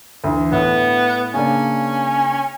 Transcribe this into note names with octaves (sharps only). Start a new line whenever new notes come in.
D2 D3 E3
A2 B3
C#3 A#3 C#4 D4